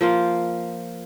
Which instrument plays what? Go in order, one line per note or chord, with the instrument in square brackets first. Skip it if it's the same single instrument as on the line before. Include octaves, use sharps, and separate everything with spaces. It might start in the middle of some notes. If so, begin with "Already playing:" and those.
[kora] F3 A#3 F4